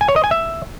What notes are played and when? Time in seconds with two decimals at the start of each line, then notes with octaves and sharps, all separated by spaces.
0.01 G#5
0.08 C#5
0.16 D#5
0.24 G#5
0.31 E5